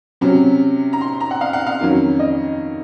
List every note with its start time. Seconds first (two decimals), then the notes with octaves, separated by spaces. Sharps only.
0.21 C3 F#3 C#4
0.93 A#5
1.01 C6
1.20 A#5
1.31 F#5
1.41 F5
1.53 F#5
1.67 F5
1.80 F2 D#3 F#3 C#4
2.19 D#5